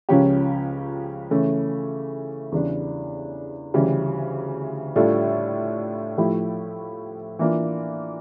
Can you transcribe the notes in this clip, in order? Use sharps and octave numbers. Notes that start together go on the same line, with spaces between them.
C#2 C#3 F3 C#4 G4
C#3 E3 A3 C#4
E2 C#3 G3 D4
D2 C#3 E3 G3 C#4
A2 G3 D4 F4 A4
A2 F3 A3 E4 G4
E3 A#3 D4 F4